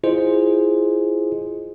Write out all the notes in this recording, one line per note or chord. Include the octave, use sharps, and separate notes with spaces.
E4 F4 G#4 C5 D#5